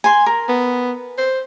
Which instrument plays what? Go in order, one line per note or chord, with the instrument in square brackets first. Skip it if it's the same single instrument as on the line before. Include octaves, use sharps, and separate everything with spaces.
[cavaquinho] G#5 C6
A#4
[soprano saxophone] B3
C5